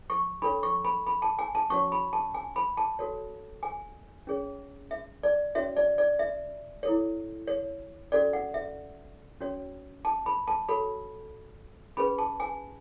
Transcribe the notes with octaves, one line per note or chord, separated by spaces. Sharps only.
C#6
D4 A4 C#5 B5
C#6
B5
B5
A5
G#5
A5
C#4 F#4 C#5 C#6
B5
A5
G#5
B5
A5
F#4 A4 C#5
G#5
C#4 G#4 C#5
E5
D5
C#4 F#4 C#5 E5
D5
D5
E5
E4 A4 C#5
C#5
C#4 F#4 A4 D5
F#5
E5
C#4 F#4 C#5
A5
B5
A5
F#4 A4 C#5 B5
C#4 G#4 B4 B5
A5
G#5